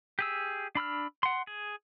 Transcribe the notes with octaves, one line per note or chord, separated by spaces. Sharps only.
G4 G#4 E6
D4 B5 E6 F6
F#5 C6
G#4